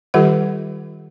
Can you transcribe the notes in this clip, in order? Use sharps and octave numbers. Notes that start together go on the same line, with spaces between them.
D#3 G3 F4 G4 A4 F#5